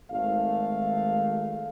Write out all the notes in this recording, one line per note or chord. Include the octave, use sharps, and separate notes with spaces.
G#1 A3 F5